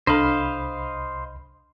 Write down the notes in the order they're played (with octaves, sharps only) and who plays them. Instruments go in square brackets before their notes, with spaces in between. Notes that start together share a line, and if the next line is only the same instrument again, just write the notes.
[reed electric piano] C2 B5 [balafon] D4 A4 [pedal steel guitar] C5 D#5 F5